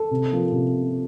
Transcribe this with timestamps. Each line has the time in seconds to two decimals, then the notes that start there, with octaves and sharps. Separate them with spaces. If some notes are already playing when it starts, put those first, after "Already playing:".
Already playing: A4
0.11 C3
0.31 F3 A#3
0.52 C3